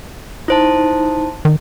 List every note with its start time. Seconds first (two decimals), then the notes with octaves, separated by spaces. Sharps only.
0.48 D#4 E4 C5 A5
1.45 D#3